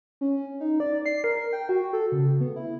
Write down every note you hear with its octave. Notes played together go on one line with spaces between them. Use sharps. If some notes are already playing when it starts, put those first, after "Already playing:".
C#4
D#4
D5
C7
A#4
G5
F#4
A4
C#3
B3
E4